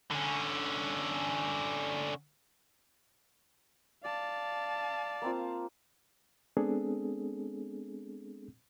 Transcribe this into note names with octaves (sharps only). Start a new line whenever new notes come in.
D3 C#4
D5 F5 A5
A#3 C4 F4
G#3 B3 C4 D4 G#4 A4